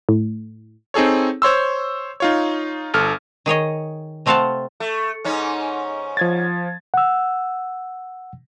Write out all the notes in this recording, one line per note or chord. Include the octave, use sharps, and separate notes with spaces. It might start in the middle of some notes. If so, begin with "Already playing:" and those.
A2
C4 D#4 G#4 A4 C#5
C5 C#5 C6 E6
D#4 F4 C#5
G1 A4 F6
D#3 G#4 C#5 D#5
C3 A3 C4 F5 F#5 A5
A3
G#2 C#4 D#4
F3 G#6 A6
F#5 E6